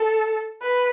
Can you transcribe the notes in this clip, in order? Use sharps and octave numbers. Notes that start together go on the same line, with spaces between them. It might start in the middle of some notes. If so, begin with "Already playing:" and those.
Already playing: A4
B4